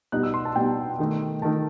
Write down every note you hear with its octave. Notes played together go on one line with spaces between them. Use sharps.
B2 G3 B3 D#4 F#6
E6
C6
A5
B2 G3 B3 D#4 G5
D#3 A3 D#4
D#3 A3 D#4 A5